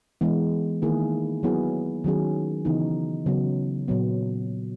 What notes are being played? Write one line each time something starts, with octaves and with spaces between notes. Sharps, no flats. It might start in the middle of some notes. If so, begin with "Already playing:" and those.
E3 G#3 B3
D#3 A#3 E4 G#4
F#3 B3 E4 G#4
D#3 F#3 C#4 G#4
C#3 E3 B3 D#4
C#3 F#3 B3
A#2 F#3 B3